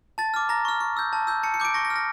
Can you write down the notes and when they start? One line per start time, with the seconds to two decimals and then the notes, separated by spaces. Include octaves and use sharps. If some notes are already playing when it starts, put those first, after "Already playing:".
0.18 A5 A6
0.34 D6 F6
0.49 A#5 A#6
0.65 C#6 F6
0.80 C#6
0.97 E6 G6
1.13 A5
1.27 E6 G6
1.43 A5 C#7
1.54 C#7
1.60 D6 G6 D7
1.74 C#6 A#6
1.85 A#6
1.90 F6
1.96 A#6